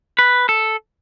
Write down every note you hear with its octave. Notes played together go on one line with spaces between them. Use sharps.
B4
A4